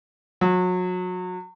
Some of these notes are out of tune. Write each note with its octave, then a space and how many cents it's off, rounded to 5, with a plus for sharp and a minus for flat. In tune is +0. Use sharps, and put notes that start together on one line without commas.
F#3 -30